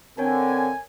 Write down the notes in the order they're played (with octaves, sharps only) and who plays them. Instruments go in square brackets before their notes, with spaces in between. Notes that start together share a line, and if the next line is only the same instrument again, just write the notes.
[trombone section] D3 [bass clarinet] C4 [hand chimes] A#4 C#5 [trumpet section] G#5